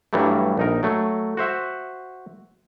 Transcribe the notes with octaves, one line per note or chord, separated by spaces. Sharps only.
G2 E3 F#3 G3 A3
A#1 D#4 A#4
F#3 A3
F#4 C5 E5 F#5